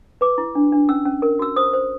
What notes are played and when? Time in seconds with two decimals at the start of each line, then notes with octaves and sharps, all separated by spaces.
0.21 B4 D6
0.38 E4
0.55 D4
0.72 D4
0.89 C#4 E6
1.05 C#4
1.22 A#4
1.39 F#4 E6
1.56 C5 D#6
1.73 C5